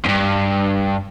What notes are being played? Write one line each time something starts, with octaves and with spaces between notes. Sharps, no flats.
E2 G2